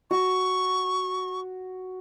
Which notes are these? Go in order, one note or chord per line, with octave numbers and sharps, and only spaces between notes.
F#4 C#6